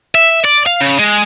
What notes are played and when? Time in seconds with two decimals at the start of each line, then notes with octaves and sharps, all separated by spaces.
0.15 E5
0.45 D5
0.66 F5
0.81 C#3
0.99 G#3